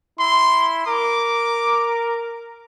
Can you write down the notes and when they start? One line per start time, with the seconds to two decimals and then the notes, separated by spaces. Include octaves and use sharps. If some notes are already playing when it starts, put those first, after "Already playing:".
0.19 E4 C6
0.87 A#4 D6